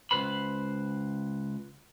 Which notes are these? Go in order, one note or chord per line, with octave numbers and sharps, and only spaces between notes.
C#2 F3 B4 C5 B5